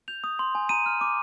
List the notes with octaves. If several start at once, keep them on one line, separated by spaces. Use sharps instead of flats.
G6 F7
D#6
C6
G#5
A#5 D#7
F6
D6